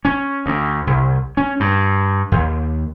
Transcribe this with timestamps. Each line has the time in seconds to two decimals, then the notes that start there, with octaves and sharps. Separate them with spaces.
0.05 C#4
0.46 D2
0.87 C2
1.37 C#4
1.60 G2
2.32 D#2